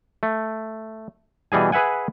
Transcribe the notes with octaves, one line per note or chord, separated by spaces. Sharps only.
A3
B2 E3 G3 G#4 G#5
G#4 B4 E5 F#5 G#5